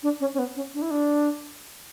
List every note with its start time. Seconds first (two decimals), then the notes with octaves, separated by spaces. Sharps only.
0.03 D4
0.20 C#4
0.34 C#4
0.39 B3
0.56 C#4
0.74 D4
0.82 E4
0.91 D4